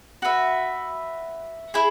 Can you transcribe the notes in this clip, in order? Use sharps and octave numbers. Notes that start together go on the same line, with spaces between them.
F#4 B4 E5
E4 G#4